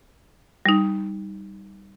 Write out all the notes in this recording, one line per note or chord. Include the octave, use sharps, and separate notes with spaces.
G3 D#4